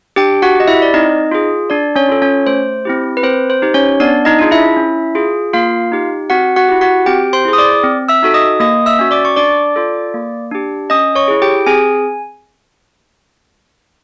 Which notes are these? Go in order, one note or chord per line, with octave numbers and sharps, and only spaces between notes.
D4 G4 G5
F#4 F#5
G4 D#5
E4 E5
D5
C4 D#4 D#5
F4 G#4
D4 D5
C#4 C#5
F4 A4
C#4 C#5
A3 C5
C4 E4 G4
B4
C4 C5
C5
D#4 G4
C#4 C#5
B3 D4 D5
D#4 D#5
D4 F4 G#4
E4 E5
C#4
F4 G#4
A#3 F4 F5
D#4 G4
C4 F#4 F#5
F#4 F#5
E4 G4
F#4 F#5
C4 G4 G5
C5 C6
E4 G#4
D#6
D5 D6
C4
E5 E6
D#4 F#4 A4
D#5 D#6
A#3 D#5 D#6
E5 E6
C#4 F#4
D5 D6
C#6
D4 D5 D6
F4 A4
A#3
D4 G4
C#4 D#5 D#6
C#5 C#6
E4 G#4
G4 G5
C4 G#4 G#5